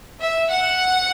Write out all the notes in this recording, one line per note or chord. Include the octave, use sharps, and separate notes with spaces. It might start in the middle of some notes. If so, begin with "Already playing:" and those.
E5
F#5